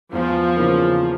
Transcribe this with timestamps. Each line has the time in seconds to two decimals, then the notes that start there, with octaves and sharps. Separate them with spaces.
0.12 E2 F3
0.56 C#3 E3 A#3